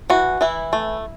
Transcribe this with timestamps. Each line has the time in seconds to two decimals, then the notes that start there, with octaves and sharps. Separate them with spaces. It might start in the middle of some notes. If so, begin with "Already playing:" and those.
0.10 E3 F#4
0.41 E3 E4
0.73 A3